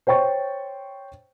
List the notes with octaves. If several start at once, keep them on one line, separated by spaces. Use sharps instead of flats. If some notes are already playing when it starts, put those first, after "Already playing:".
C5 C#5 G5 C#6 A6